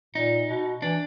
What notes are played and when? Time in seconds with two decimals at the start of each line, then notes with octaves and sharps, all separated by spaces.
0.15 A#2 D#4
0.49 B2
0.82 E3 D4